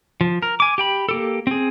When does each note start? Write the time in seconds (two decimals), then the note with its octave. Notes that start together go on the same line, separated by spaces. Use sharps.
0.21 F3
0.43 A#4
0.60 G#5 D6
0.78 G4 G5 B5
1.09 A#3 G4 A4
1.47 C4 G#4